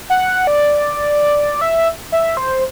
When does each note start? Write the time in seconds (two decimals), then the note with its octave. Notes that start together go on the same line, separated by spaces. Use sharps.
0.10 F#5
0.47 D5
1.61 E5
2.12 E5
2.37 C5